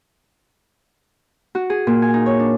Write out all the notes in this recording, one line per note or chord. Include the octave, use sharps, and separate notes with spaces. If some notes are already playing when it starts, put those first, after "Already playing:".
F#4
G#4
A#2
G#5
D#4
C#5
D4